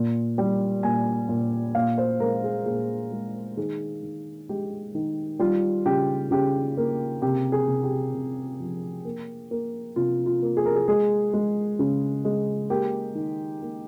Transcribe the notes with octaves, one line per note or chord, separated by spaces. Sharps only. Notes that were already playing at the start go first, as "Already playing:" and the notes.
Already playing: A#2
G3
A#2 G#5
A#2
A#2 F5
C5
G#3 A#4
G#4
A#2 G#4
G#3
D#3 G#4
D#3
G#3 G4
D#3
G3 F4
C#3 G4
C#3 G4
A#3
C3 G4
G#4
C3
G4
C3
F3
A#3
A#3
C3 F4
F4
A#3
G#4
A#4
G#4
G#3 G#4
G#3
C#3
G#3
A#3 G4
D#3
A#3